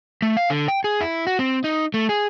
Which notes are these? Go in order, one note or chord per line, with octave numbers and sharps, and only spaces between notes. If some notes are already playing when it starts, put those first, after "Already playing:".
A3
F5
D3
G5
G#4
E4
F#4
C4
D#4
A3
G#4